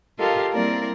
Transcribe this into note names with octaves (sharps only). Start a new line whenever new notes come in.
F4 G4 A4 A#4 D#5 F5
G3 A#3 C4 E4 A#4 D5